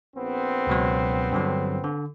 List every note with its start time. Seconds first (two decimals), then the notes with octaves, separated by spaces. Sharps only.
0.16 A#1 B3 C4
0.67 C#2 B2 F#3
1.32 G2 D3 F#3
1.84 D3